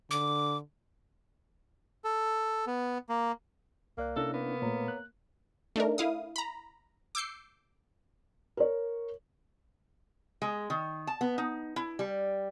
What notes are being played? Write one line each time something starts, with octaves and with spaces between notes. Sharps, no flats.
D3 D6
A4
B3
A#3
C2 A#3 D5 F#6
C3 C#4 D4 E4 A4 F#6 A#6
A#3 B3
A#2 A3 C#5 A#5
F#6
A3 D4 D#4 A#4
E4 F5 D#6
A#5 B5
D6 E6 G6 C7 C#7
A#4 C#5
G#3
D#3
A5
B3
D#4
E4
G3